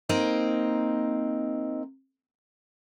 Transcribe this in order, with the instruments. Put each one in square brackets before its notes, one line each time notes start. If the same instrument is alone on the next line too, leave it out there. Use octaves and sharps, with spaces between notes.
[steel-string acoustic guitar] A#3 C4 D#4